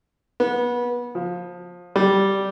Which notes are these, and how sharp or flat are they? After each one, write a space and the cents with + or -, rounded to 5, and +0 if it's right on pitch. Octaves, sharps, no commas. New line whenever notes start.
B3 -25
F3 +20
G3 -5